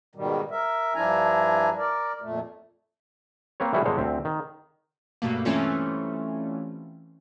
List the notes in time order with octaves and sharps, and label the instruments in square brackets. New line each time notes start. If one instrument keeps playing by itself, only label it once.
[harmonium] G#2 B2 D#3 G3
A#4 E5
G2 F3 D4 E4 G#5 A#5
A#4 D5
F2 A#2 A3
[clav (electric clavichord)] A#3 C4 B4 C#5
E3 G3 A3 E4 F#4 G#4
G1 D3 G#3 A#4 C5 C#5
D2 C4 E5
D#3
[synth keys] G2 B2 A3 A#3
E3 G3 A3 C4 C#4 F4